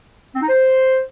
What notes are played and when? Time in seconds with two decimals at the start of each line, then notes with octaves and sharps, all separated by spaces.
0.35 C4
0.42 D#4
0.49 C5